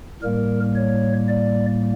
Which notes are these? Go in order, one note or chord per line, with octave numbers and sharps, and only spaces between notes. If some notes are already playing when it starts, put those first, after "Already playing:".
A2 G3 A#3 A#4
C#5
D5